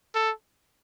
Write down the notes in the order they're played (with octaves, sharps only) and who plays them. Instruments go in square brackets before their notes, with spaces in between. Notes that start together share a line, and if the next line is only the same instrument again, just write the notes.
[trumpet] A4